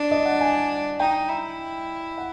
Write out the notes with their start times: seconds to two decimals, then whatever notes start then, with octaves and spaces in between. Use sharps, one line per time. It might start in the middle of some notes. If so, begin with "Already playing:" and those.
Already playing: D4 D5
0.11 D#5
0.25 F#5
0.41 G#5
0.99 D#4 G5
1.29 E4
2.18 F#5